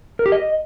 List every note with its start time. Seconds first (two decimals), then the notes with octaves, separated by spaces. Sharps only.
0.19 A#4
0.26 G4
0.32 D#5